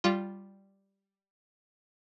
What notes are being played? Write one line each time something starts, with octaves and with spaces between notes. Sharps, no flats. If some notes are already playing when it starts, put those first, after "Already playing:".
G3 F4